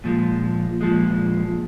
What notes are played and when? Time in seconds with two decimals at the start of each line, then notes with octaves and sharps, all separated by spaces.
0.04 A#2 F3 G#3
0.81 A#2 F3 G#3